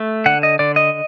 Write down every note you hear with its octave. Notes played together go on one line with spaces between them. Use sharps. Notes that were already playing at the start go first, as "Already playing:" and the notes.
Already playing: A3
D3 F#5
D#5
D3 D5
D#5